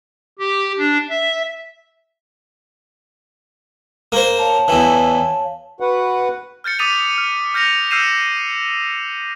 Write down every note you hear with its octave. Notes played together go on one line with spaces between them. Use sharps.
G4
D4
E5
A#3 C5
C#5 F5 A5
E2 E3
F#4 B4 F#5
F6 G6 A6 C#7
D6 D#6 A6 B6 D#7 F7
F6
F6 G6 A#6 C#7 F7
E6 F6 G6 C7 D#7 E7